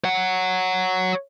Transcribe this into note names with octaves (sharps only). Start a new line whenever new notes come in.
C#5 F#5